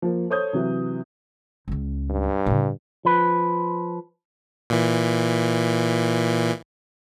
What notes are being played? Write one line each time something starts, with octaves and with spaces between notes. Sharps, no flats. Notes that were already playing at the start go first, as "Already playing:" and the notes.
F3 A#3
A4 C5 C#5 D#6 G6
C3 E3 F#3
C#2 C#4
G2
A2 C#3
F3 B4
A#2 E3